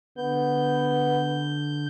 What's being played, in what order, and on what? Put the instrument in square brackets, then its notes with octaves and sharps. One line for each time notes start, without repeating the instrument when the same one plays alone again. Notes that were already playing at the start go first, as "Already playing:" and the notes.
[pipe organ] D3 G6 [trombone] B3